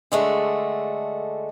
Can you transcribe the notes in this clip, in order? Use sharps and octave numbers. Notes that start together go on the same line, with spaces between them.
D3 G#3 A3 F#4